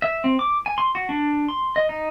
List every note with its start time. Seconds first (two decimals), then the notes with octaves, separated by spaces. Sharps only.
0.02 E5
0.24 C4
0.39 D6
0.66 G#5
0.78 C6
0.95 F#4
1.09 D4
1.48 C6
1.76 D#5
1.89 D#4